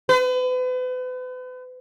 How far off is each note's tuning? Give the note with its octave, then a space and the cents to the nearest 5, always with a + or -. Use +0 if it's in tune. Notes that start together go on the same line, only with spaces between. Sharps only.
B4 +40